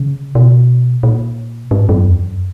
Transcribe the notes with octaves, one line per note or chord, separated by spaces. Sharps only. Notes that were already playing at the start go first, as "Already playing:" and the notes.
Already playing: C#3
B2
A#2
G#2
F#2
E2
F#2